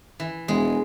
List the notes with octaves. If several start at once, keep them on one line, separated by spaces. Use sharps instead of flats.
E3
E1 G#3